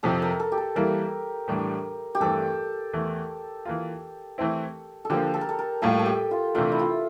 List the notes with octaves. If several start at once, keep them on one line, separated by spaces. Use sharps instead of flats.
F2 C3 F3 A4
A#4
A4
G4
A4
E3 G3 A#3 E4 A#4
A2 E3 G3 D4
G4
G2 E3 A3 C4 A4
E2 E3 A3 E4
E3 A#3 F4
E3 A3 C4 E4
A4
D3 F3 A#3 G4
A4
A#4
A4
A#4
A2 G3 A#3 F4 A4
A4
G4
F4
C3 E3 A3 D4 F4
E4
F4